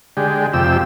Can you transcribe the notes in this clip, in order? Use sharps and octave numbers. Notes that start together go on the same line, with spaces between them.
D3 G#3 G4
F2 C3 G4 E6